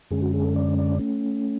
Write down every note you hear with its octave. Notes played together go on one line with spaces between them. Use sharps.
F#2 D3 G#3 C#4 G#4
F#4
G#4
A4
D5
D5
A3 C#4